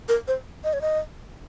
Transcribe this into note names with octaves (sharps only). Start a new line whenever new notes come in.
A#4
C5
D#5
C#5
D#5